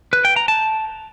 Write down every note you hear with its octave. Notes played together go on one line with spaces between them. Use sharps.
B4
G5
A#5
A5